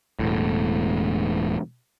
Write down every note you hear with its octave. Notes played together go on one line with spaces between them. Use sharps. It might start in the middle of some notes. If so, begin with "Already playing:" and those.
E1 A2